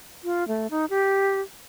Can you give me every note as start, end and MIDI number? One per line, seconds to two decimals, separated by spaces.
0.24 0.47 65
0.48 0.67 57
0.71 0.85 63
0.90 1.40 67